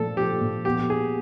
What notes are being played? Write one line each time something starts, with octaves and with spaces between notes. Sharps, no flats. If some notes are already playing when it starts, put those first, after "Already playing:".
Already playing: A#2 F3 A3 A4
F3 G4
A#2
B3 G4
G4 G#4